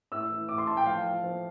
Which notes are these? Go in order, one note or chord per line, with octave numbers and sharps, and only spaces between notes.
A2 E6
E3
A2 D6
C6
A2 A5
G5
F3 F5
F3
F3